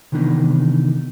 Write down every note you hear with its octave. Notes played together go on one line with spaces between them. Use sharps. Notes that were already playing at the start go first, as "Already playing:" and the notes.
C3 D#3 E3 B3 D4 D#4